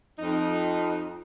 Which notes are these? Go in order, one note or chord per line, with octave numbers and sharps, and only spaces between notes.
F2 D#4